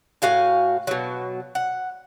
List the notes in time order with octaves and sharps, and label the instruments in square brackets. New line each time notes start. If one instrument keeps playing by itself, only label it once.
[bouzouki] A2 F#4 F5 G#5
B2 F#3
F#5